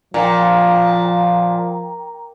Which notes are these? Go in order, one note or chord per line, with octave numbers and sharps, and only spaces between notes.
A#2 F3 G5 A#5